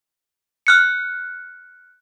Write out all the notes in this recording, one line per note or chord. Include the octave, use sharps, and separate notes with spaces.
F6 F#6 C#7